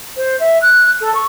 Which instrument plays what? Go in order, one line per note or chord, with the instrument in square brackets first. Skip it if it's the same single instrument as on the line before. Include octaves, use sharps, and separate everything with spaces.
[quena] C5
E5
F#6
A4
C#6